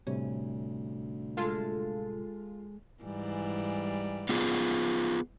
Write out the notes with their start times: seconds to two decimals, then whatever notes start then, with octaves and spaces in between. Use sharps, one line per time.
0.07 D2 A2 C3 G3 C#4
1.37 G#3 F4 A4 E5
3.03 G#2 E3 G3
4.29 B3 F4 G#4